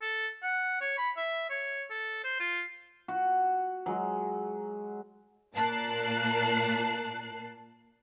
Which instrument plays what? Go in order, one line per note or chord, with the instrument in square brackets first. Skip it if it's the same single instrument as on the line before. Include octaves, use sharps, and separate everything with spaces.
[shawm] A4
F#5
C#5
B5
E5
C#5
A4
C5
F4
[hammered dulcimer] F#4
F#3 G#3
[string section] A#2 A#4 A5 F#6 C7